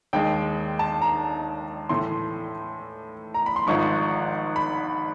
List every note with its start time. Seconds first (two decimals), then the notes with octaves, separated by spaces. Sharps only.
0.13 D#2 D#3 G#3 G5
0.79 A5
1.02 A#5
1.89 A2 E3 A3 C6
3.34 A#5
3.46 B5
3.56 C6
3.67 G#1 G#2 F3 C#6
4.56 B5